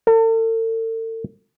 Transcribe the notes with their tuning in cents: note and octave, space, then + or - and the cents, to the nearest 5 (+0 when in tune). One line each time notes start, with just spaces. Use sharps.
A4 +40